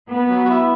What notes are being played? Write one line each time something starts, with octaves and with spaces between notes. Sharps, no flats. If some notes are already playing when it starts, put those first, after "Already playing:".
B3
F#3
F#4
E4